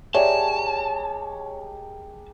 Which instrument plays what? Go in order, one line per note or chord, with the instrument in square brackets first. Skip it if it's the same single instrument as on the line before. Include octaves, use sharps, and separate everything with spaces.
[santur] G#3 G4 A#4 [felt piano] C#5 [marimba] D5 E5 G#5 [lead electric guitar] A5